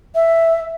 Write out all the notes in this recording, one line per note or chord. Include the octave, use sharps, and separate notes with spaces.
E5